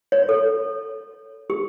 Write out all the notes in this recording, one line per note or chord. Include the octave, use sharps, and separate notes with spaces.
C#5
A4
G4